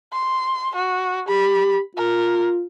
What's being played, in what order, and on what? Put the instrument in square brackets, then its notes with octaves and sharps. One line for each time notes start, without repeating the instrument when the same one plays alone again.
[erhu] C6
F#4
[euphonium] G4 [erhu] B5
[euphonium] F4 [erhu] A#4